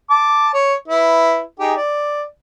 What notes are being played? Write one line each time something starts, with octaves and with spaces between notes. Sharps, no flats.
A5 D6
C#5
E4 B4
D#4 G4 G#4
D5